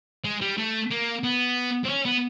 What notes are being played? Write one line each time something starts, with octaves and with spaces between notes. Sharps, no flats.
G#3
G3
A3
A#3
B3
C4
C#4
B3